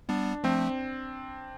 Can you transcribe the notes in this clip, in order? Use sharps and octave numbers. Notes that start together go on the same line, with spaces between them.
G3 B3 D4
F3 A3 C4